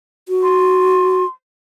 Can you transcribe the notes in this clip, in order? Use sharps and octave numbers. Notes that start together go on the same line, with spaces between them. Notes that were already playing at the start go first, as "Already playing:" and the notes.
F#4
C6